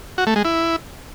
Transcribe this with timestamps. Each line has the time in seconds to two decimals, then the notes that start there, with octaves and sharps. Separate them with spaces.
0.18 F#4
0.27 A3
0.36 G#3
0.45 E4